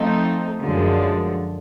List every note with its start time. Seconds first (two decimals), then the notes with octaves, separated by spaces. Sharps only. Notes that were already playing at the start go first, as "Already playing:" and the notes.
Already playing: F3 A3 C4 D#4
0.62 F#2 D3 F3 G#3